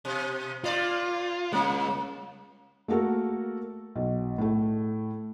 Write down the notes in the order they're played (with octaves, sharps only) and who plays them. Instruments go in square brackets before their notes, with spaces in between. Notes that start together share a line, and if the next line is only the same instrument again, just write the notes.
[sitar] B2
[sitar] A#2 D5 [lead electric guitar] F4
[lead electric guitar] G#3 C#4 [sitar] A#3
[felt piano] A3 A#3 F#4 A4 A#4
B1
A2 A3